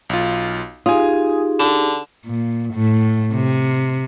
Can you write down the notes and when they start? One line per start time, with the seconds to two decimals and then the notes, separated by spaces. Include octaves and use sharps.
0.10 B1 F4
0.86 D#4 F4 G4 G#4 G#5 D#6
1.59 D3 E7
2.26 A#2
2.74 A2
3.33 C3